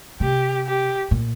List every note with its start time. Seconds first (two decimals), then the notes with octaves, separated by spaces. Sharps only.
0.20 C3 G4
0.66 G4
1.11 A#2